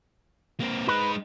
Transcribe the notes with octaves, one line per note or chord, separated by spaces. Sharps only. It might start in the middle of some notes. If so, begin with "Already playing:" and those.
A#3 C4
G#3 D#4 B4